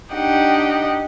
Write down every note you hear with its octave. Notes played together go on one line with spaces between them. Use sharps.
D4 D#4 G4 D#5 F#5 G5